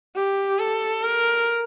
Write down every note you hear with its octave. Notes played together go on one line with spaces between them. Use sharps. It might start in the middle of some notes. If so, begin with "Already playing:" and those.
G4
A4
A#4